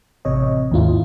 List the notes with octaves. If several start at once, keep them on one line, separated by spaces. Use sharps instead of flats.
A1 C3 C#5 D#5
D#2 G#2 E4 F4